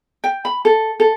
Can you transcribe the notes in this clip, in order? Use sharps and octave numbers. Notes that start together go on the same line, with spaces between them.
G5
B5
A4
A4